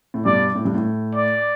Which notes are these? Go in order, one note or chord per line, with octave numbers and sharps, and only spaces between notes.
A2
G2 B2 D5
A2
G2
A2
D5